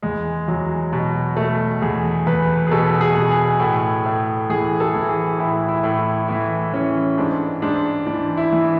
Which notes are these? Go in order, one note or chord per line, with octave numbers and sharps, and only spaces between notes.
E2 G#3
E2 F#3
B2
B2 A3
E2 G#4
E2 B4
G#4
B2 A4
G#4
B2
G#4
A2
A2
E3 G#4
A4
E3
G#4
A2 E4
E4
A2
E4
E3 E4
E3 C#4
G#2 D4
G#2 D4
E3 D4
E4
E3